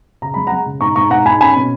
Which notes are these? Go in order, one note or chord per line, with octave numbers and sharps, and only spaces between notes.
C#3 A#5
G#3 B5
G#3 F#5 A#5
C#3
G#2 A#5 C#6
G#2 A#5 C#6
G#2 F#5 A#5
G#2 G#5 B5
C#4 G#5 B5
B2